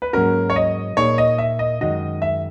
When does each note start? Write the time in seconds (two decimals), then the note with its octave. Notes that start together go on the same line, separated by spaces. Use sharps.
0.02 B4
0.13 G#2 F#3 A#3 C#4 F#4 A#4
0.50 C#5
0.56 D#5
0.97 A#2 A#3 D#4 G#4 C#5
1.18 D#5
1.38 E5
1.59 D#5
1.81 F#2 D#3 G#3 D#4 F#4 D#5
2.22 E5